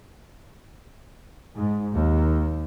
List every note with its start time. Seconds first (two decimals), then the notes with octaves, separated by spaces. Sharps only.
1.56 G#2
1.95 D#2